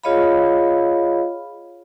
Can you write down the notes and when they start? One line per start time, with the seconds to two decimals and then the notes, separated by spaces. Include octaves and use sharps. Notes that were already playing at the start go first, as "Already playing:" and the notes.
0.04 F4 G#4 C#5 D#5 F5 B5